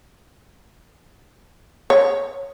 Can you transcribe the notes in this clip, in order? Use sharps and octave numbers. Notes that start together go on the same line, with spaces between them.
C#5